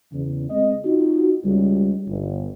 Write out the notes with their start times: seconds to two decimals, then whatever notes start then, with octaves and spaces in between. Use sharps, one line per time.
0.13 E2 C#3
0.50 G#3 C4 D#5
0.85 D#4 F4 F#4
1.44 C#2 G3
2.08 G1